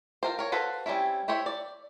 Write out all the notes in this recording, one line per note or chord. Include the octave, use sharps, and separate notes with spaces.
F4 A#4 C5
A#4 C#5
F#4 A4 B4 C5 F5
G3 C4 C#4 E4
E4 G4 C5 C#5 E5
D5